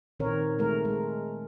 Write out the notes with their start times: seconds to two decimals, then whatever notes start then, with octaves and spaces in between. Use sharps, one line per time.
0.20 A#2 D#3 C4 A#4 C#5
0.59 G#3 A3 A#4
0.85 G#3